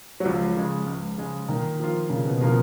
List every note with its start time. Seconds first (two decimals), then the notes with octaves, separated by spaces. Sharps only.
0.20 F#3
0.25 C#2 F3
0.56 C#3 G#3
0.86 C#2
1.18 C#3 G#3
1.48 A#2 D#3
1.80 F3 A#3 F4
2.10 A#2 C#3
2.25 B2
2.41 B2 F3 A#3 F4